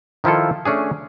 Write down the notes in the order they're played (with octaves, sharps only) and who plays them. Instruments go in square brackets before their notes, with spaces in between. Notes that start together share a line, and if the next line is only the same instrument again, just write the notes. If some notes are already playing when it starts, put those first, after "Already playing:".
[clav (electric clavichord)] D#3 F3 E4 F4 A4
A3 C#4 D4 G#4